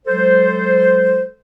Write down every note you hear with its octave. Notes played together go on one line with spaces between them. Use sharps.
F#3 G#3 A4 C5